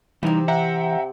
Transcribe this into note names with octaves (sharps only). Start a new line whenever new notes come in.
C3 E3 G3 C4 D#4 A#5
E5 F#5 G5 A#5